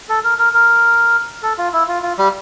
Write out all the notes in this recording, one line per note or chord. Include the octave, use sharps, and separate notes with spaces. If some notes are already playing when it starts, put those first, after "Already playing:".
A4
A#4
A#4
A#4
A4
F4
E4
F4
F4
G3